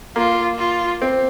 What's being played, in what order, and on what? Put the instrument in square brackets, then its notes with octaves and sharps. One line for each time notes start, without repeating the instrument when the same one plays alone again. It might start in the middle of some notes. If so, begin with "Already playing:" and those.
[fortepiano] A#3 [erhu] F4
[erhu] F4
[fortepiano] C4